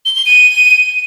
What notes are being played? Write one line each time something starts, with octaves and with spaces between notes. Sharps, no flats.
G7
G7
D#7